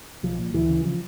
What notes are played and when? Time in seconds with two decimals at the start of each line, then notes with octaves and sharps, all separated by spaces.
0.23 B1 F3
0.38 A#2
0.54 D2 E3
0.69 C#3
0.85 F3